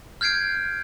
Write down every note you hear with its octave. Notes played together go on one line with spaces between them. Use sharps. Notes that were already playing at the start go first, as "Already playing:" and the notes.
F6 G6 G#6 C7 D7